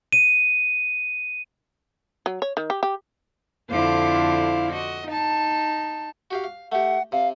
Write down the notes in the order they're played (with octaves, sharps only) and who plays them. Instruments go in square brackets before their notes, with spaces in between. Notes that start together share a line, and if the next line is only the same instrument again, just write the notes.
[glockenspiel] D#7
[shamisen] F#3
C#5
D#3
G4
G4
[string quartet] F2 D3 E4 C5 F5 D6
F#4 D#5
D#4 A5
[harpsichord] F#4 G4 F5
F5
[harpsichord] A3 G4 [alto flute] F#5
[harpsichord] C3 [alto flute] F5